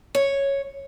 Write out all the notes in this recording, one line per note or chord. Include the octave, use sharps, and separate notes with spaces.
C#5